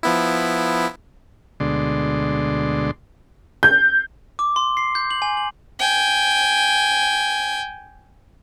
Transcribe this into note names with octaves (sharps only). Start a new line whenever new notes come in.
F3 B3 E4
D2 B2 D3 G#3 D5 C6
G6
D6
C6
C7
G6
F#7
G#5
F#7
G5 G#5